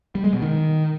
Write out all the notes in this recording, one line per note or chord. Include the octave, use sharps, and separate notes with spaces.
G3
G#3
B2
D#3